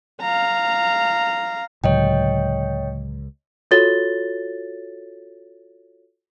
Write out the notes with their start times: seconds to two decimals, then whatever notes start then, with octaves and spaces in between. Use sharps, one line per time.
0.21 F5 A#5
1.84 C#2 A2 D3 F#3 C#5 D#5 G5
3.71 F4 F#4 A4 C#5 A6 G7